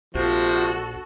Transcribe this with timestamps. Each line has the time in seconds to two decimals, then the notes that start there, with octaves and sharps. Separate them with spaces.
0.15 A#1 C3 F3 F#4 A4